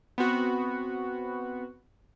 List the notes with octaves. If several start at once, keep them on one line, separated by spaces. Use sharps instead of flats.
B3 C4 F#4